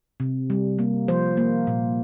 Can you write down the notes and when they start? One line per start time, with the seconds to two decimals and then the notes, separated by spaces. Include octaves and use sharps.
0.20 C3
0.50 G3
0.79 A#3
1.08 F3 C5
1.37 A#3
1.67 A#2